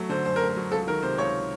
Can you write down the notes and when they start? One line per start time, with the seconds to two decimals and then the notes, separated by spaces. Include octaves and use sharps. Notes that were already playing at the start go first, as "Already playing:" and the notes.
Already playing: F#3 A3
0.09 D3 C5
0.25 F#2 C5
0.36 A#4
0.41 A3
0.48 A#4
0.56 F#3
0.72 C#2 A4
0.87 D#3 A#4
1.02 C3 C5
1.18 C#2 C#5